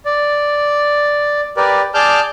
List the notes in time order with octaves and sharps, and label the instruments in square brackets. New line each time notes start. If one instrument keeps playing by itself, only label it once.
[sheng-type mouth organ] D5
G4 A#4 B4 D5
G#4 D5 A5 D6 F6 G6